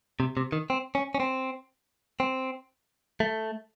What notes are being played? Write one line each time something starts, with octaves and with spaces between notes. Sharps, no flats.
C3
C3
D#3
C4
C#4
C#4
C4
C4
A3